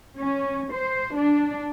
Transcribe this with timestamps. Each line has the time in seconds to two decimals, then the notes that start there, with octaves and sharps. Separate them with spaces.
0.19 C#4
0.74 C5
1.17 D4